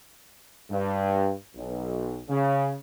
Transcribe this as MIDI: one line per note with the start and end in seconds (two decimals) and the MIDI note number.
0.70 1.32 43
1.55 2.21 35
2.29 2.73 49